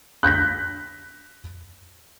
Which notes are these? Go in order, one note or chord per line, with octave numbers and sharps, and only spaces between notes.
F#6 G6 A#6 B6